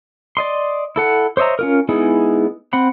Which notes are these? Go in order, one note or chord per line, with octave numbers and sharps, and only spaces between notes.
D5 D#5 C6
E4 A4 F#5
C5 C#5 D#5 E5 A#5
C#4 F4 A#4
G#3 B3 D#4 E4 G#4
C4 F#5 B5